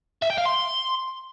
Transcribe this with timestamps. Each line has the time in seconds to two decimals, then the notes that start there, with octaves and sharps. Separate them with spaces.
0.22 E5
0.30 G5
0.38 F5
0.46 C6